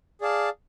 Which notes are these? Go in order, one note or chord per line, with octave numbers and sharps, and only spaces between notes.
G#4 D5 F5 A5